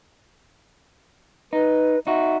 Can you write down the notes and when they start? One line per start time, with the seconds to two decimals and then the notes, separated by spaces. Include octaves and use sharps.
1.53 D#4 B4
2.07 D#4 F#4 E5